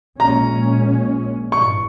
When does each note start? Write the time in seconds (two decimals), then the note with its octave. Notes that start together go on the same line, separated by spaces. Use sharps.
0.20 A#1 A#2 G#3 C#4 A#5
1.52 G#1 G2 E3 C#6